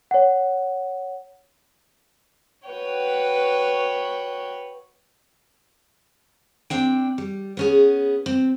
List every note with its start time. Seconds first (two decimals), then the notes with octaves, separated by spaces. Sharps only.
0.11 C#5 F#5
2.68 F#4 B4 C#5 G5
6.70 C4 D4 G5
7.18 G3
7.57 B3 C#4 G#4
8.26 C4